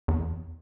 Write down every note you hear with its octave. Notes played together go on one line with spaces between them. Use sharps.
E2